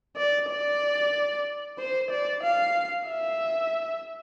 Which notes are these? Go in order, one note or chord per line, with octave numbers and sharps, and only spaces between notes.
D5
D5
C5
D5
F5
E5